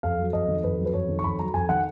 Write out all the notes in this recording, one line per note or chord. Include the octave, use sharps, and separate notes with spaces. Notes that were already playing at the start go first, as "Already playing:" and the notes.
F2 F5
F#3
F2 D#5
D#3
F2 B4
F#3
B4
F2 C#5
D#3
C#6
F2 B5
F#3 A#5
F2 G#5
D#3 F#5